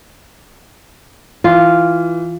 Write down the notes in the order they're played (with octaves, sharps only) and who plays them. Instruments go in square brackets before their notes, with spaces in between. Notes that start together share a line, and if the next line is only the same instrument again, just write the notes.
[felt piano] E3 [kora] F4